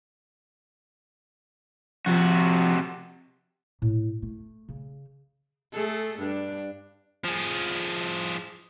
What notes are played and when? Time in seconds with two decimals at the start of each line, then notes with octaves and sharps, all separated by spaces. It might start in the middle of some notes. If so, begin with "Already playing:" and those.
2.06 C3 F3 F#4
3.82 A2
4.22 A3
4.69 C#3
5.72 A3 G#4 A4
6.18 G2 D4
7.24 F3 G#4